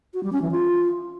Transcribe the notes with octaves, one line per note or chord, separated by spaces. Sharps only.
F#4
G3
C#4
E3
F4